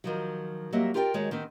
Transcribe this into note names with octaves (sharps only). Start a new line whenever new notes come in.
D#3 F3 F#3
F#3 G3 A#3 C4 D#5 E5
F4 G4 A#4 D5 E5 G5
D#3 G#3 F#4 C#5
D#3 B3 C4